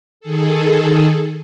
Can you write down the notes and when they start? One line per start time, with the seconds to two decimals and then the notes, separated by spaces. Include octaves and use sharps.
0.20 D#3 G#4 A4